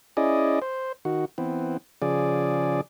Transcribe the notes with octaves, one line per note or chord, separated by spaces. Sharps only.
C#4 E4 G#4 D5 D#5
C5
D#3 F#4
E3 B3 C4
C#3 F3 G#4 D5